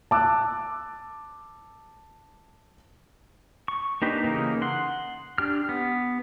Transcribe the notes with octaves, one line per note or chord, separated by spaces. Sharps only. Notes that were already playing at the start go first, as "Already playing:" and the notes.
A5 D6 E6 F#6
C#6
A#3 D4 D#4 G4 B4
C#3 E3 A#3 D#4
F#5 C6
D4 G4 F6
B3